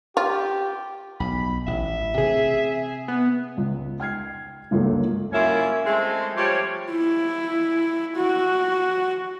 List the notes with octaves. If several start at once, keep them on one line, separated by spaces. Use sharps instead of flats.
F4 G4
B1 B5
A1 E5
C3 C4 G#4
B3
C#2
G5 F6 G#6 C7
G1 C#2 F#2 A#3 F#4 A4
F#2 A#3 C#4 E4 F4 G#5
G#3 A3 C4
F3 G3 F4 G4 C#5
E4
F#4